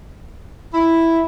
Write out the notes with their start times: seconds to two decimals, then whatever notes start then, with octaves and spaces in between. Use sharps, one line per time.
0.73 E4